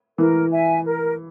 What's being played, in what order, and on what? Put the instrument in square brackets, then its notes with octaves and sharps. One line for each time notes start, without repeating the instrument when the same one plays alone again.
[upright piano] E3 [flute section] A#4
[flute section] E5 G#5
A#4